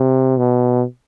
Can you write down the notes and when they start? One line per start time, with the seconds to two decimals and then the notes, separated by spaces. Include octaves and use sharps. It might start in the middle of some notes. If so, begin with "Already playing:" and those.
Already playing: C3
0.38 B2